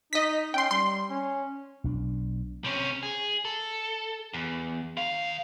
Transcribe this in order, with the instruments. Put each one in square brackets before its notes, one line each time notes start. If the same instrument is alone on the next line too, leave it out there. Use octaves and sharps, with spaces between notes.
[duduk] D#4 [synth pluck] D#5 B6
[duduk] C#4 [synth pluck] G5 C6
[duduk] G3 [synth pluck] C6
[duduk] C#4
[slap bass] B1 D4
[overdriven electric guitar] C3 C#4
G#4
A4
E2
D#3 F5